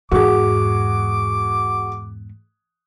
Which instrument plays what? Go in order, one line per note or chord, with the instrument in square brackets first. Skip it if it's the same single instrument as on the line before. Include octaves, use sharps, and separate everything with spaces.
[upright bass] E2 G#2 [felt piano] F#4 G#4 [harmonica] D6